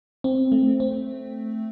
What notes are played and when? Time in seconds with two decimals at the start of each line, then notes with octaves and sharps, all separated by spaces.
0.24 C4
0.52 A3
0.80 C4